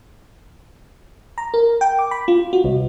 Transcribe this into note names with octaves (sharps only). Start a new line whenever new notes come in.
A#5
A#4
G5
D6
B5
F4
F#4
C2